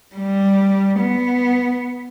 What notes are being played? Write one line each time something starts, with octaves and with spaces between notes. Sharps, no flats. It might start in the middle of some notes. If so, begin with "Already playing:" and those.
G3
B3